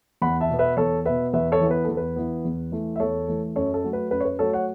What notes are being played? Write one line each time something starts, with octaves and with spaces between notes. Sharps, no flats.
E2 F#5 B5
E5 A5
B2 B3
B4 E5
E2 A4 C#5
B2 B3 B4 E5
E2 B4 E5
A4 C#5
E3 B3
B4
E2 A4
B4
E3 B3
E2
E3 A3
E5
E2 A4 C#5
E3 A3
F#2 A4 C#5
A4
F#3 A3
B4
F#2 B4
C#5
B4
F#3 A3 A4 C#5
C#5 F#5